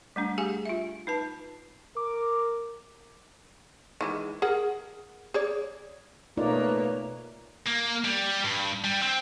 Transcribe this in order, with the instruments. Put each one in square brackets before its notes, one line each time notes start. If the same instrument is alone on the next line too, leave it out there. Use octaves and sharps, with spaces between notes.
[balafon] G3 A3 D4
G4 G#4 F5 G#5
F4 E5
D#4 B4 A5
[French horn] A#4 [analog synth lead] D6
[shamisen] D#3 E3 G#3
G#4 A#4 F#5
G#4 C#5 D5
[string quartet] B2 A#3 C#5 [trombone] A3 [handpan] D#4 F4 D5 [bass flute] B4
[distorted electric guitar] A#3
G3
G2
G3
C4